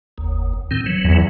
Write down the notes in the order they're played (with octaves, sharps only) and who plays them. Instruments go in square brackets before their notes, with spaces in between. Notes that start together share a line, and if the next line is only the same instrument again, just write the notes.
[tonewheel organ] F#1 D#2
A2 D#3 C4
E3 F#3
[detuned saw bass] E2